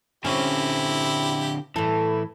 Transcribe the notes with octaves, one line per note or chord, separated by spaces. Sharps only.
D3 C4 C#4 E4 G4
A2 E3 A4